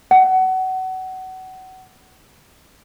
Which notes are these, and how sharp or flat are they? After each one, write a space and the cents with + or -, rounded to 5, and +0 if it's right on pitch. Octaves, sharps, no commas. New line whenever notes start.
F#5 +25